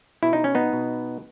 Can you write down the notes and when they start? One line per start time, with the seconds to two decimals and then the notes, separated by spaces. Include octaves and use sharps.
0.23 B2 E4
0.33 D#4
0.44 C#4
0.55 B3 D#4
0.73 B2